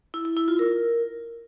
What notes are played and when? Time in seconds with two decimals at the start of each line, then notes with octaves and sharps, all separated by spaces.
0.14 E4
0.25 E4
0.37 E4
0.48 F4
0.59 A#4